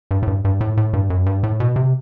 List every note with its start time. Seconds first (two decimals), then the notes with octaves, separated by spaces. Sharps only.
0.11 G2
0.23 A2
0.27 G2
0.45 G2
0.61 A2
0.77 A2
0.93 G2
1.10 F#2
1.26 G2
1.43 A2
1.60 B2
1.76 C3